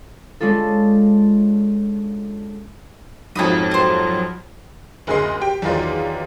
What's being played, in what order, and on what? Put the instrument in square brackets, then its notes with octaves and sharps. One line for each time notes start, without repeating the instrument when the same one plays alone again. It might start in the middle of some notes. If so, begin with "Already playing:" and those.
[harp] G#3 C#4 D4 F4 A4
[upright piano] F2 G#2 [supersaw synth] F3 F#3 [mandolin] C#4 B5 D#6
[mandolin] G4 C5
[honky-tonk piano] F#1 D2 G#4 D#5 C6 C7
G4 G5
E2 D#3 F#3 F4 D5 C6